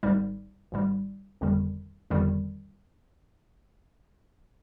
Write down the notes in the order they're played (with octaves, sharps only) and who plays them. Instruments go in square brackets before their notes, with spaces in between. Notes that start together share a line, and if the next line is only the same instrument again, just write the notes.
[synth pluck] G#1 G#2 G3
G#1 G#2 G3
G1 F2 D#3 G3
G1 F2 D#3 G3